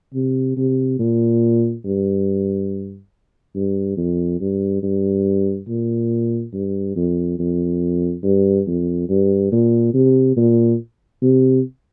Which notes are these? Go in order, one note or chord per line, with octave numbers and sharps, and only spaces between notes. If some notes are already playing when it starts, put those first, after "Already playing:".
C3
C3
A#2
G2
G2
F2
G2
G2
A#2
G2
F2
F2
G2
F2
G2
A#2
C3
A#2
C3